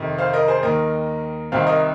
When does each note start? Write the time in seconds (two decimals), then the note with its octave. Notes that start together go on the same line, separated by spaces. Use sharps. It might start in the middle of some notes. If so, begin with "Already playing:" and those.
Already playing: F2 C3 D#3
0.18 C5 F5
0.33 A#4 D#5
0.48 G#4 C5
0.63 D#2 D#3 A#4 D#5
1.52 C2 C3 D#3 C5 F5
1.67 A#4 D#5